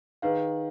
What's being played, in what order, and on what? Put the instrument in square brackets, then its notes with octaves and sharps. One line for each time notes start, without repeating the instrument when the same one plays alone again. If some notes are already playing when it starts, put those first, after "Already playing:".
[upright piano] D#3 [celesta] G#4 B4 F5